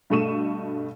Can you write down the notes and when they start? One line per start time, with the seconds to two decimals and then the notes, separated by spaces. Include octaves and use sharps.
0.10 G2 B2 A3 C#6 D#7 E7